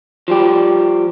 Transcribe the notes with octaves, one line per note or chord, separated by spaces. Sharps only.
F3 G3 G4